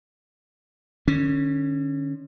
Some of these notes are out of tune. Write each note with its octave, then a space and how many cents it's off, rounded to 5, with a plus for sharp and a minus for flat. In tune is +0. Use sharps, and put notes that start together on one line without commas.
D3 +40 C#4 +0